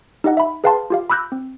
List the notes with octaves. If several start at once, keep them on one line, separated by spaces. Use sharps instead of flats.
D#4 G4 D#5 F#5
E5 B5
G#4 B4 F5 G5 A5 C6
F4 G4 F5
B5 D6 E6 F#6 G6 A#6
C4